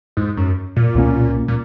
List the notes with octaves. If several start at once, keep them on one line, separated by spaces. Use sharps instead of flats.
G#2
F#2
A#2
C#2 B2 A#3 C#4
A#2